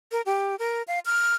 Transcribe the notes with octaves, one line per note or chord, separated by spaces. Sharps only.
A#4
G4
A#4
F5
F6